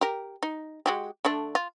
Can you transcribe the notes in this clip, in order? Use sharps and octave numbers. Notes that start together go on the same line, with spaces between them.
G4 A#4
D#4
G#3 F#4 G4
D3 A3 D4
F4